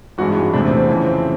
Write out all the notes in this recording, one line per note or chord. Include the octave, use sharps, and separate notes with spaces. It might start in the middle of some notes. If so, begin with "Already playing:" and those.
G#1 G2 E3 G#3 F#4
F#4
E2 C3 E3 A3 D4
C4
C4
F2 C#3 E3 G#3
C4